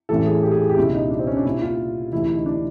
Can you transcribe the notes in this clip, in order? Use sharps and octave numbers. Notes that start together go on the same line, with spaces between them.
A1 A2 E3 A4
G#4
G4
G#4
G4
C#2 B2 E4
D#4
D4
C4
C#4
D4
C2 A#2 E4
F4
D2 C3 E3 E4
E4
D#4
D4